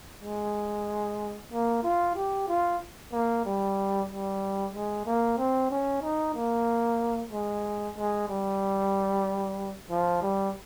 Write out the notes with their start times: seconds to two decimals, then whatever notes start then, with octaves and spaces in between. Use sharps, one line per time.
0.23 G#3
1.52 A#3
1.83 F4
2.16 G4
2.48 F4
3.13 A#3
3.45 G3
4.09 G3
4.74 G#3
5.06 A#3
5.38 C4
5.71 C#4
6.02 D#4
6.35 A#3
7.31 G#3
7.97 G#3
8.28 G3
9.90 F3
10.22 G3